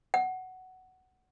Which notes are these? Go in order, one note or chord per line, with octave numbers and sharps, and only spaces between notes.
F#5